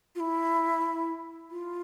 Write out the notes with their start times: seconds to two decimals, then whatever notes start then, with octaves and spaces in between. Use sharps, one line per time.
0.15 F4
0.20 E4
1.51 F4